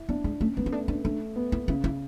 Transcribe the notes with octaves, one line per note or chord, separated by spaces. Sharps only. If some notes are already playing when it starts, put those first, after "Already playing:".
Already playing: E4
B3 D4
G#3
A3 C#4
G#3 B3
C#4
A3 D4
D4
A3 D4
B3
E4
C#3 E4
E4